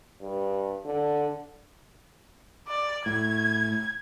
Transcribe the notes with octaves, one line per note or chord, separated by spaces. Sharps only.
G2
D3
D5
A2 G#6